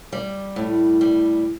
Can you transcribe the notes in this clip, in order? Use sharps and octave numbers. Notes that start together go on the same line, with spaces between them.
G3
A2
G3